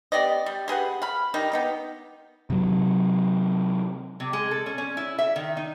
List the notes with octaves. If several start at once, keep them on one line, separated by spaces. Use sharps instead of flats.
B3 G4 D5 D#5
G3
G4 G#4 B4 F#5
F5 B5
D#3 G3 D#4
B3 D#4 G4
C3 F#3
C3
G#3
A4
C#4
C#4
E4
E5
D#3
D#4